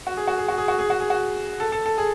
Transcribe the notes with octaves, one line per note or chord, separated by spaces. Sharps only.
F#4
G#4
F#4
G#4
F#4
G#4
F#4
G#4
F#4
G#4
F#4
A4
A4
A4
G#4